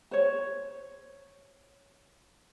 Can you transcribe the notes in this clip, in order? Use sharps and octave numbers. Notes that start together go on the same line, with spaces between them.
C5 C#5